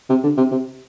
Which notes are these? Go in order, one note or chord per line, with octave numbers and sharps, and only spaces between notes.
C3
D3
C3
C3